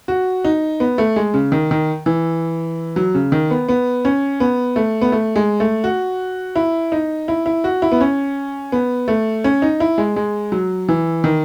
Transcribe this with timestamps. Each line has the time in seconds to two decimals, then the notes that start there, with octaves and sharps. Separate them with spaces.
0.08 F#4
0.45 D#4
0.80 B3
0.98 A3
1.16 G#3
1.34 C#3
1.52 D#3
1.71 D#3
2.06 E3
2.96 F#3
3.14 C#3
3.32 D#3
3.51 B3
3.69 B3
4.05 C#4
4.40 B3
4.76 A3
5.01 B3
5.12 A3
5.36 G#3
5.60 A3
5.84 F#4
6.56 E4
6.92 D#4
7.28 E4
7.46 E4
7.64 F#4
7.82 E4
7.92 B3
8.01 C#4
8.72 B3
9.08 A3
9.44 C#4
9.62 D#4
9.80 E4
9.98 G#3
10.16 G#3
10.52 F#3
10.89 E3
11.24 D#3